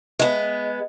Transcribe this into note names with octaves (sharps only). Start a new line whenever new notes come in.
G#3 B3